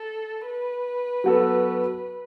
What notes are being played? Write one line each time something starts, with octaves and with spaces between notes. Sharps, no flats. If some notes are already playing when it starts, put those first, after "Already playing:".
Already playing: A4
B4
F#3 B3 F#4 A4